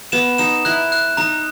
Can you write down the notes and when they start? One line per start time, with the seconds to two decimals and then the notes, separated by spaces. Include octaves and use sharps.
0.12 B3 E7
0.38 D#4 E7
0.65 E4 F#6
0.92 F#6
1.17 D#4 A#5